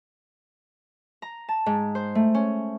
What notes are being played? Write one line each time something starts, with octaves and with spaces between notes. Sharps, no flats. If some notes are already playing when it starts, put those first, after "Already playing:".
A#5
A5
G#2
C5
A3
C#4